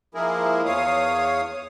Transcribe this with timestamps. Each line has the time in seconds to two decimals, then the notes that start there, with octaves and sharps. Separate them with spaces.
0.15 F3 G#3 A#3 E4 G#4 A#4
0.65 E2 C#5 F5 D#6